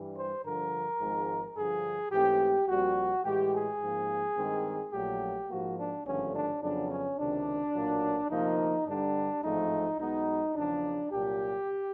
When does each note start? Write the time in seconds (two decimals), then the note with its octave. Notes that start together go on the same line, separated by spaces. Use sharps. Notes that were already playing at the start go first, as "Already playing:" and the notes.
Already playing: G2 E3 G3
0.15 C5
0.43 G2 D3 F3 A#4
1.00 G#1 G#2 F3 G#3
1.56 G2 D3 F3 G#4
2.12 G#2 E3 A3 C4 G4
2.68 A#1 A#2 G3 C4 F#4
3.24 A2 E3 G#3 G4
3.53 G#4
3.81 G#2 F3 A#3
4.37 G2 D#3 G#3 C4
4.93 A#1 A#2 F#3 A3 G4
5.49 G#2 F3 A#3 F#4
5.78 D4
6.05 G#1 G2 D3 F3 A3 C#4
6.34 D4
6.62 F2 C#3 F#3 B3 D4
6.90 C#4
7.18 C#2 C3 D#3 D4
7.74 B1 A#2 F#3 A#3
8.31 D2 C3 F3 A#3 D#4
8.86 G2 D3 G3 D4
9.43 A1 G#2 F3 A3 C4 D#4
9.99 B1 B2 G#3 B3 D#4
10.55 E2 C#3 F3 D4
11.11 C2 A#2 F#3 G4